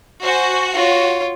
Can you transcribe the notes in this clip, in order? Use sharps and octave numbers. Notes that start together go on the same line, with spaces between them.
F#4 C5 G#5
F4 C#5